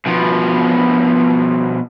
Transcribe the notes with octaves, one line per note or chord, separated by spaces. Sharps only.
B2 F3